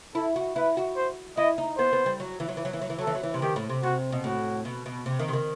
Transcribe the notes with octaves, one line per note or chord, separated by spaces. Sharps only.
E4 A4
F#4
E4 B4
F#4
C5
E4 D#5
D#4
B3 C5
B3
G3
F#3
E3
F#3
E3
F#3
E3
F#3
E3
F#3 A4
E3
F#3
E3
C3
D#3 G4
A2
C3
C3 F#4
B2
A2 F#4
B2
B2
C3
D#3
C3
D#3